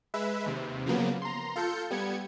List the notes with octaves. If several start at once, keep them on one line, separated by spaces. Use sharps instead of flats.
G#3 B4 E5
D#2 C3
C#3 F3 F#3 A#3 B3
A#5 C6
F4 A4 G6 C#7
G3 B3 G#6 C#7